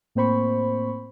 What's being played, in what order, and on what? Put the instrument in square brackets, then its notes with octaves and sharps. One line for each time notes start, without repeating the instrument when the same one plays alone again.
[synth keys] A2 A#3 C4 C5 B5 C#6